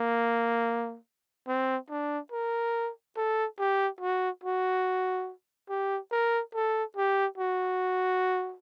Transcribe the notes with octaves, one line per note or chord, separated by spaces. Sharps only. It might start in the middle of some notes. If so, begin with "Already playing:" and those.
Already playing: A#3
C4
D4
A#4
A4
G4
F#4
F#4
G4
A#4
A4
G4
F#4